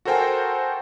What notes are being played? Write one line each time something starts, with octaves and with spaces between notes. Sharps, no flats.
F#4 A4 A#4 C5 G5 G#5